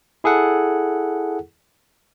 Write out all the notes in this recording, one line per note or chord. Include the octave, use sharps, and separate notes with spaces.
E4 G#4 A4 F#5